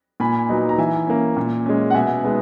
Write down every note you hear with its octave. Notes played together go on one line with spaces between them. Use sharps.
A#2 G#5 B5
F#3 B3 D#4
A#5
E3 E5 G#5
A#3 C#4
A#2
G#3 C#4
F#5
B2 E5 G#5
G#3 B3 D#4